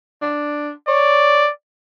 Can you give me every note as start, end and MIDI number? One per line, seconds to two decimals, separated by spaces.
0.22 0.71 62
0.88 1.45 73
0.88 1.51 74